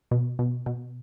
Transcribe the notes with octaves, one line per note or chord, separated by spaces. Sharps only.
B2
B2
B2